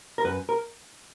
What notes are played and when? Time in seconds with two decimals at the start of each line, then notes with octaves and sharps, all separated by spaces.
0.18 A#4
0.24 F#2 B4
0.49 A#4